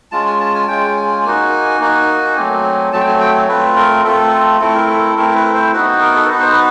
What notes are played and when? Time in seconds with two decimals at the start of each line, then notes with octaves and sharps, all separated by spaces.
0.12 G#3 C#4 F4 A5
0.26 G#5
0.40 A5
0.55 G#5
0.68 G#3 C#4 F4 G5
0.97 G#5
1.24 A#3 D#4 F#4 G#5
1.80 A#3 D#4 F#4
2.36 F#3 A3 C4 G#5
2.93 F#3 A3 C4 A5
3.00 G5
3.07 G#5
3.21 G5
3.35 C#5
3.49 A3 C4 F4 B4
3.76 A#4
4.04 A3 C4 F4 A4
4.61 A3 C4 E4 A4
4.75 A#4
4.88 A4
5.16 A3 C4 E4 A#4
5.35 B4
5.54 C5
5.73 B3 D#4 F#4 B4
6.01 A#4
6.15 A4
6.29 B3 D#4 F#4 B4
6.40 C5
6.52 B4